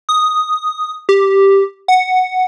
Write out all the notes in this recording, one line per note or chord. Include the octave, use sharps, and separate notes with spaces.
D#6
G4
F#5